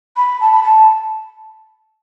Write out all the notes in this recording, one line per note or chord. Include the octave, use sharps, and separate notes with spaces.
B5
A5
B5
A5